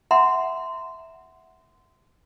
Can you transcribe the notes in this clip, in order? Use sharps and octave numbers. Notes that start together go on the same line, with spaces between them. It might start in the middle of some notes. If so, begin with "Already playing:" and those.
E5 F#5 A#5 C6